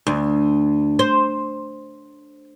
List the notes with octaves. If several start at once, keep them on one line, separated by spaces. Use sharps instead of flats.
D2
C5